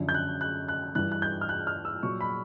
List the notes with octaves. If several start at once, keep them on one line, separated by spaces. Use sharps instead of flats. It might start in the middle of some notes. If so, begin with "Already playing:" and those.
Already playing: F#2 D3 F3
G6
F#6
F#6
F#6
G2 E3 F#6
F#6
G6
F6
F#6
F6
E6
A#2 F#3 C#6
B5